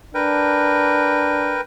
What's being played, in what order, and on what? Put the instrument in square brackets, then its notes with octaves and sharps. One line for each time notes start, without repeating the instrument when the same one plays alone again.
[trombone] D4 [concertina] A#4 B4 G5